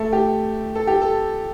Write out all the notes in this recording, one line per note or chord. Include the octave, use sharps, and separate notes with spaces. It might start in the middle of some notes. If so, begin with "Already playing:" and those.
Already playing: A3
G4
A4
G4
A4